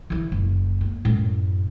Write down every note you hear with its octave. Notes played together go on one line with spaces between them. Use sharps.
D3 E3
F#1
A#3
F#2 A2